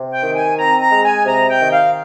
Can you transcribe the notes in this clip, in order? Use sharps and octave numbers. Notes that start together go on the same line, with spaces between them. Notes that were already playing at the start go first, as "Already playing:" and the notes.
Already playing: C3
G5
D#3
G#5
C4 A#5
A#5
G#3
G#5
C3 A#5
G5
D#3
F5